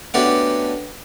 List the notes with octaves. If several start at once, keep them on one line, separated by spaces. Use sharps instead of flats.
A3 B3 C#4 D4 F#4 G4